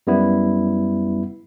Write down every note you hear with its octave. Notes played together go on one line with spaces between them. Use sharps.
F#2 G3 B3 E4